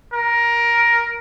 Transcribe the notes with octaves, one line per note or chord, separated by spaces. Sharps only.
A#4